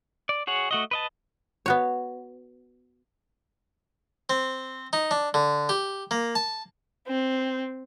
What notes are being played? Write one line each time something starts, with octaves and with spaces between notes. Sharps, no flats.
D5
F#4 G#4 C#5 F#5
A3 F#4 D#5
B4 D#5 A5
B3 F#4 C#5
C4
D#4
D4
D3
G4
A#3
A5
C4